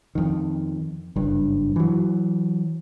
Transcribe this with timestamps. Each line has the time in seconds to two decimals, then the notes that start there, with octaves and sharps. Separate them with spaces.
0.15 F2 D#3
1.16 F#1 G2
1.76 E3 F#3